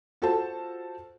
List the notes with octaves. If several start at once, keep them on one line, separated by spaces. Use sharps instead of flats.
F4 F#4 A4 C5 A5